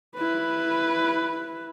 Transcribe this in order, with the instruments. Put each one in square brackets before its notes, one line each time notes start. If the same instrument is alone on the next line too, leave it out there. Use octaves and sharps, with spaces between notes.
[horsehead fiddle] E4 B4